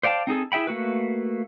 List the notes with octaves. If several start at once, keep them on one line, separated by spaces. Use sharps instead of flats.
C5 D5 F5 G5 A5
C4 D#4 G#4 A4
E4 G#4 E5 G5 B5
A3 A#3 F#4 B4